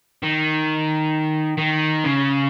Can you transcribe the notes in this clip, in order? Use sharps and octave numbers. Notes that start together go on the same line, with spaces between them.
D#3
D#3
C#3